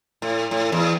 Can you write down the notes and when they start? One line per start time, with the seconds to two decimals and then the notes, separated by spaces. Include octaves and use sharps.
0.22 A2
0.51 A2
0.72 E2